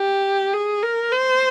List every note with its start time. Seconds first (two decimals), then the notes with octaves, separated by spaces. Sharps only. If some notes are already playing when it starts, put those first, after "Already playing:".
Already playing: G4
0.53 G#4
0.82 A#4
1.11 C5